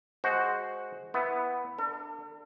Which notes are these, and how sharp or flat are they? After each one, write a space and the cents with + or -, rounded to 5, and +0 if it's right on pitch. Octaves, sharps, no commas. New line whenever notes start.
G#3 +5 F#4 +0 C5 +0
B3 +0 E4 +0
D4 +15 A4 +45